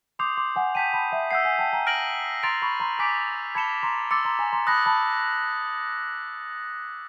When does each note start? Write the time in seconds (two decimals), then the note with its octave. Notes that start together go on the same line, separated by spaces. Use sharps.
0.19 C6 D6 D#6 G6 C7 F7
0.37 C6 D6
0.56 F#5 G#5
0.75 G5 A5 G6 B6 D#7
0.93 A5 B5
1.12 E5 F#5
1.31 E5 F#5 E6 G6 C7
1.45 F#5 G#5
1.59 G5 A5
1.73 G#5 A#5
1.87 F6 A#6 D7 F#7
2.43 A#5 C6 A6 D7 F7
2.62 B5 C#6
2.80 A#5 C6
2.99 G#5 A#5 D6 G6 B6 D7
3.55 A5 B5 G#6 C#7 E7 G7
3.83 A#5 C6
4.11 C6 D6 E6 A6 C#7
4.25 A#5 C6
4.39 G#5 A#5
4.53 A#5 C6
4.67 A5 B5 D#6 F#6 A#6
4.86 A5 B5